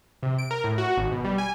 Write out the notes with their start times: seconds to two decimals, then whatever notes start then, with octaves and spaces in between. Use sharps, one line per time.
0.23 C3
0.38 D7
0.51 A#4
0.64 A2
0.78 F#4
0.97 G#1
1.12 B2
1.24 G3
1.38 G#5